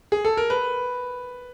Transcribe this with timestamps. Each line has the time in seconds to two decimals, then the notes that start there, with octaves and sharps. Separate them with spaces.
0.12 G#4
0.25 A4
0.37 A#4
0.50 B4